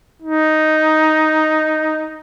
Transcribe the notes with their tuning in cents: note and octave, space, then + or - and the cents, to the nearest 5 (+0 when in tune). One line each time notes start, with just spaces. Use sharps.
D#4 +0